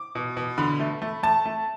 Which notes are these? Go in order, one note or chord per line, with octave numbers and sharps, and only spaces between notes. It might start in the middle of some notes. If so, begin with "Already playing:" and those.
Already playing: D6
B2
B2
D3 B5
A3
A3
A3 A5
A3